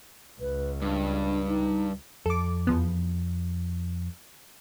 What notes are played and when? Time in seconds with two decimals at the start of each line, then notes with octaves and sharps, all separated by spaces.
0.41 C#2 B4
0.82 G2 D4
1.48 D#4
2.26 F2 A4 D6
2.67 E2 F3 B3